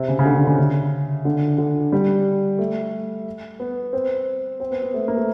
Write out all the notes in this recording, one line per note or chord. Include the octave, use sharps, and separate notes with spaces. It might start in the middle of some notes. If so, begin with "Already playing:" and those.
Already playing: C3
C#3
C#3
D3
D3
C#3
C#3
D3
D3
G3
A3
B3
C4
C4
B3
B3
A3
A#3
A3